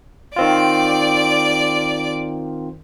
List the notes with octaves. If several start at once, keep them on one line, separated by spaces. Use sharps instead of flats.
D#3 C4 F4 D5 D6